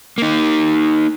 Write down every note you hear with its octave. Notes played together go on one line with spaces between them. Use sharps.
A#3 D#4